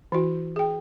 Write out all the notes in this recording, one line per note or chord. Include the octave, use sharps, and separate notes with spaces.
E3 E4 F#4
G#4 G5